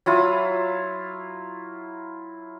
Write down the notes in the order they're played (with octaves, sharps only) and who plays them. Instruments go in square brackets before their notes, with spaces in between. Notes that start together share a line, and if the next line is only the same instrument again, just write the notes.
[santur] F#3 E4 F4